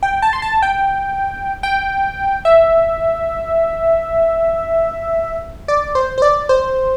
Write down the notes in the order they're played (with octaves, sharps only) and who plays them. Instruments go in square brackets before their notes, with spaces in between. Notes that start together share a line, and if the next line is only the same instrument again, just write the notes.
[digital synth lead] G5
A5
C6
A5
G5
G5
E5
D5
C5
C5
D5
C5